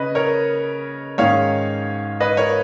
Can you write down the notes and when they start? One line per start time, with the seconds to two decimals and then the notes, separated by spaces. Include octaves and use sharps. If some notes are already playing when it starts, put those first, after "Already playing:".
Already playing: C#3 C#4 B4 D#5
0.15 A#4 C#5
1.18 G#2 D#3 G#3 C#4 C#5 F5
2.20 B4 D#5
2.37 A#4 C#5